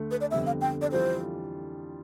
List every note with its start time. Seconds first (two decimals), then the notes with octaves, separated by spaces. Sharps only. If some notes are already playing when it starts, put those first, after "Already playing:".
Already playing: D2 D3 A3
0.11 B4
0.21 D5
0.31 F2 D3 G3 B3 E5
0.46 F5
0.61 G5
0.81 D5
0.91 F2 E3 G3 D4 F4 C5